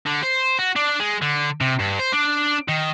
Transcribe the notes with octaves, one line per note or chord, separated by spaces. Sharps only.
D3
C5
F#4
D4
G#3
D3
C3
G2
C5
D4
D#3